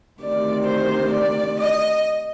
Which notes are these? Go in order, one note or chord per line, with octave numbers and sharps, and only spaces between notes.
D2 C3 D#3 D5
C5
D5
D#5